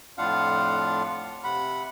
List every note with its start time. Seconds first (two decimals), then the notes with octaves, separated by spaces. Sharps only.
0.18 F2 A2 D4 F4 F5 F#5
1.44 C3 F#5 B5